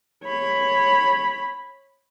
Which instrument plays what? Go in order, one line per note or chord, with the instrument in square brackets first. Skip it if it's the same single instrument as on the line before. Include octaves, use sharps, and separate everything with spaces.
[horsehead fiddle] C#5 B5